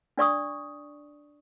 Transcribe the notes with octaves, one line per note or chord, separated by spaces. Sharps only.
D4 D5 C#6 D#6